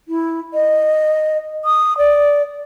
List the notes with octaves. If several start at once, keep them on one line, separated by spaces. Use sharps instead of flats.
E4
D#5
D#6
D5